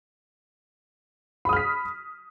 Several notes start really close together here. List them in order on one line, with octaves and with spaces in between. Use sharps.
B5 D#6 F6 B6